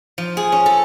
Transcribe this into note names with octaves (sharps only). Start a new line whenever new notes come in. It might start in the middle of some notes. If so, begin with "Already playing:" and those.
F3
G#4
C#4
A4